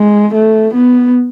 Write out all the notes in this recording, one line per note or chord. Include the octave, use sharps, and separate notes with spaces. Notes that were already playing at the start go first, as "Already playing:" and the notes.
Already playing: G#3
A3
B3